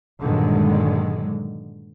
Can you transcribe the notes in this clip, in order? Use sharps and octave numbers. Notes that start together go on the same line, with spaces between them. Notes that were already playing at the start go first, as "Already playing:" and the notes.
G2 A#2 D3 D#3 F#3 G#3